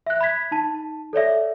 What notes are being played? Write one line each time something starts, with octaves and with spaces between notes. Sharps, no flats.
E5 F#6
B5 F#6 G#6 B6
D#4 A5
A4 C#5 D5 E5